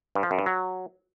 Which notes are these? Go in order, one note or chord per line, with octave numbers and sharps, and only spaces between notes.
G2
F3
F#2
G2
F#3